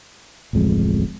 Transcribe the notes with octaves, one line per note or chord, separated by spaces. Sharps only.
D1 A1 F2 G#3